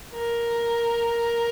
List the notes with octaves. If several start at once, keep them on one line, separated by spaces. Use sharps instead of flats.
A#4